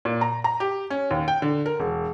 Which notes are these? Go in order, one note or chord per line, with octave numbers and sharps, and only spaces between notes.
A#2
A#5
A#5
G4
C#4
D#2
G5
D3
A#4
E1